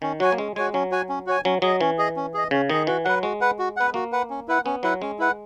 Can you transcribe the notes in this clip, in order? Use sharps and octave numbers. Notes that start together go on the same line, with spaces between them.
D#3 C#4
F#3 F#4 C#5 G#5
A#3
G#3 C#4
G#3 F#4 C#5 G#5
F#3 C#4
F#4 C#5 G#5
C#4
F#4 C#5 G#5
F#3 C#4
F#3 G#4 D#5
E3 C#4
G#4 D#5
C#4
G#4 D#5
C#3 C#4
D#3 G#4 D#5
E3 F#4
F#3 B4 F#5
G#3 F#4
B4 F#5
F#4
B3 B4 F#5
A#3 F#4
B4 F#5
C#4
E4 B4 F#5
B3 C#4
F#3 E4 B4 F#5
G#3 C#4
E4 B4 F#5